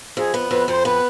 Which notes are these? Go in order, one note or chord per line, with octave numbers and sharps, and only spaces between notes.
F2 G#4
B3
F2 B4
F2 C5
B3 B4